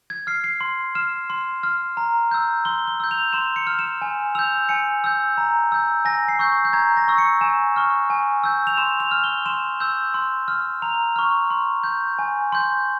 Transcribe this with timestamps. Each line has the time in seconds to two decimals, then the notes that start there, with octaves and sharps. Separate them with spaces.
0.10 G#6
0.27 F6 C7
0.44 C7
0.61 C6
0.95 F6 E7
1.30 C6
1.63 F6
1.97 A#5
2.31 E6 G6
2.65 C6 G7
2.87 G7
3.00 E6 G6
3.11 F7
3.33 C6 E7
3.56 C#7
3.67 F6
3.79 E7
4.02 G#5
4.35 E6 G6 F7
4.69 G#5 C#7
5.04 E6 G6
5.38 A#5
5.72 E6 G6
6.05 G#5 A#6
6.28 C7
6.39 C#6 E6 G6
6.65 G6
6.73 A#5 G#6
6.97 A#6
7.08 C#6 E6
7.18 C#7
7.41 G#5 E7
7.76 C#6 F6
8.10 G#5
8.44 E6 G6
8.67 F7
8.77 C6 E7
9.00 F7
9.11 F6
9.24 G7
9.46 C6 E7
9.80 E6 G6
10.14 C6
10.48 F6
10.82 A#5 F7
11.16 C#6 F6
11.50 C6
11.84 G6
12.19 G#5
12.52 C6 G6